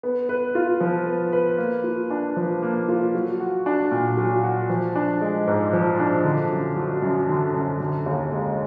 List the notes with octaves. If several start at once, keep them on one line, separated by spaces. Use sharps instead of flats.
B3
B4
F4
F3
B3
B4
A#3
F4
D4
F3
A#3
F4
F#3
F#4
D4
A#2
F#3
F#4
F3
D4
G#3
G#2
F3
D4
D3
F#2
F#3
F#2
D3
F#2
D3
D#2
G#3